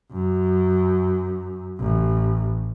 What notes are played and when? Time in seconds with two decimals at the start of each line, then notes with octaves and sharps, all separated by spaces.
0.12 F#2
1.80 A1